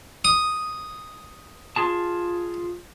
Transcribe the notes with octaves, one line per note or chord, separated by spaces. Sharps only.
D#6
F4 G#4 A5